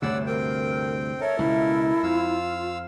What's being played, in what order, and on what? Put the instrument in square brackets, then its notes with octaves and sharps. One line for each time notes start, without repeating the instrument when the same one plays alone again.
[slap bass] D2 G2 C3 [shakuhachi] C#5 [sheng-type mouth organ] D5 F#5 E6
[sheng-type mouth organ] C4 G5 [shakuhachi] A#4
[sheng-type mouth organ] A4 A#4 [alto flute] C#5 [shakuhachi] E5
[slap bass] C#2 B2 [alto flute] E4
[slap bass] F2 [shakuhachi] F4 [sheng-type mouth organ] F5 E6